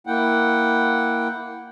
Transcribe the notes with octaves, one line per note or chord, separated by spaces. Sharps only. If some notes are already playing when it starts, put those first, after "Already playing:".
A#3 E4 F#5 G5